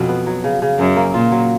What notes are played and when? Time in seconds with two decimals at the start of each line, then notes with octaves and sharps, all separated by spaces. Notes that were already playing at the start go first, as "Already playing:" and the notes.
Already playing: F2 B2 F#3 C#4 F#4
0.09 B3
0.27 F#3
0.44 C#3
0.62 C#3
0.79 F#2 C#4
0.97 A#3
1.14 A#2 F4
1.32 F#3